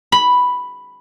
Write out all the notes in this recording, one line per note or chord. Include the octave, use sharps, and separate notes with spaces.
B5